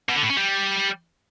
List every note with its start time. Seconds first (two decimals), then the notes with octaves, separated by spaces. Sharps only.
0.09 B2
0.16 D3
0.23 A2
0.30 C#4
0.37 G3